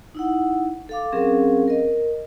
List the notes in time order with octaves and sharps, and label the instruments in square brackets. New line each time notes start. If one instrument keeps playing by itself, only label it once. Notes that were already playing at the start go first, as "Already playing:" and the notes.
[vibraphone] D#4 E4 F#5
A4 F5 D6
F#3 C4 C#4 G#4 A#4 F5
A#4 D#5